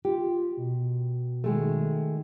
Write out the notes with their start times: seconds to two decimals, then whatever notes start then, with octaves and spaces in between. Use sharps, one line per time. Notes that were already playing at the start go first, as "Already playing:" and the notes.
0.05 F4 G4
0.57 B2
1.44 D#3 G#3 A3